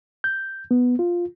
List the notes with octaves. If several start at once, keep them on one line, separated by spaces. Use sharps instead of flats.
G6
B3
F4